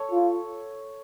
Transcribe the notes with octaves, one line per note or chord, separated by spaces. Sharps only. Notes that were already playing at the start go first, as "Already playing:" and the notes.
Already playing: A4 C#5
F4